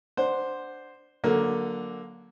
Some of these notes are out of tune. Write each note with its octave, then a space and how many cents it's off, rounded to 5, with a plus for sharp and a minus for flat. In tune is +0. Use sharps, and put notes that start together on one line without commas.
D4 +5 C5 +0 F#5 +0
D3 +0 F#3 +0 A#3 +10